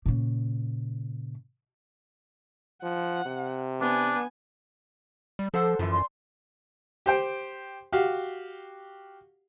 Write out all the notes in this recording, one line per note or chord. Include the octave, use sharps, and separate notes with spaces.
A#2 C#3
F3 F#5
C3
B3 D4 G#5
G3
F3 A4 C5 F#5
F#2 E3 F3
D5 C6
G4 C5 G5
F#4 G4 F5